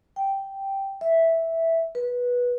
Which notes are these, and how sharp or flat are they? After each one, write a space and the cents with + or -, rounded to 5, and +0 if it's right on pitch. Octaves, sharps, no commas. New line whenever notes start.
G5 -5
E5 -5
B4 -15